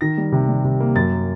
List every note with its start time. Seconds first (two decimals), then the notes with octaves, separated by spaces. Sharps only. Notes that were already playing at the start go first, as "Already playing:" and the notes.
0.01 D#3 A#6
0.18 G3
0.32 C3
0.49 G3
0.64 C3
0.80 A#3
0.95 F#2 A6